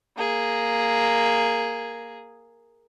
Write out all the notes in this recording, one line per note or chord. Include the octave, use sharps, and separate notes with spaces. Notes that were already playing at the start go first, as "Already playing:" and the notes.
A#3 G#4